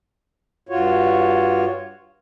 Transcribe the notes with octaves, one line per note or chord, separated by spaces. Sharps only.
G2 F4 F#4 C#5